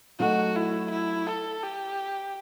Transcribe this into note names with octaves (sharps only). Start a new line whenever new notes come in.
F#3 A3 D#4 F#4
E4
E4
A4
G4